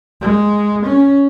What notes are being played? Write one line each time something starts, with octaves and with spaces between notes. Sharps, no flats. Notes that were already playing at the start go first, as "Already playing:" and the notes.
G#3
C#4